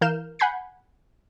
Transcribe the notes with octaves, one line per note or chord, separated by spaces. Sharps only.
E3 A#4 F5 F6 G6 E7
F#5 G#5 B5 G6 G#6 C7